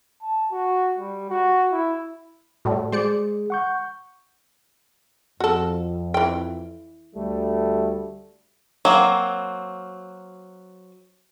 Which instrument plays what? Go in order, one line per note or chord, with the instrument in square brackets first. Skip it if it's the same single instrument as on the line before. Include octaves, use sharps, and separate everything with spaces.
[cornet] A5
F#4
G3
F#4
E4
[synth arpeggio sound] A2 G3 A3 [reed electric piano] F#4
[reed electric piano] G#3 G#4 [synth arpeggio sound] C5 D5 C#7
[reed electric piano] F#5 C#6 G6
[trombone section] F2 [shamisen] F#4 A4
[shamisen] E3 G5
[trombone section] D2 G3 A3
[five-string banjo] F#3 A#3 C4